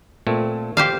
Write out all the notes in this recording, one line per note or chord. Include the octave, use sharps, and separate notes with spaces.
A#2 A3 C4
G4 C5 D5 F5